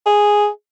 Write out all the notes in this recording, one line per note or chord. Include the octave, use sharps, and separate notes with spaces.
G#4